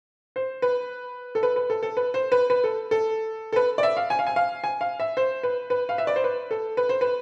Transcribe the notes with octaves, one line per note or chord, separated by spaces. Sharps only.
C5
B4
A4
B4
B4
A4
A4
B4
C5
B4
B4
A4
A4
A4
B4
D5
E5
F5
G#5
F5
G#5
F5
G#5
F5
E5
C5
B4
B4
F5
E5
D5
C5
B4
A4
B4
C5
B4